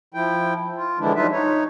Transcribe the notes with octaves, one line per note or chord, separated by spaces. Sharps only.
F3 E4 G5
F4
D3 E3 F3 G#3 D4 E4
F#3 G3 D#4 F4 B4 E5
D#4 C#5